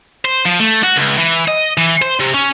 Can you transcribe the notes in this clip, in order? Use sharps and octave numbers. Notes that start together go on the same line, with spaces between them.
C5
F3
A3
F#4
C#2
E3
D#5
E3
C5
C3
C#4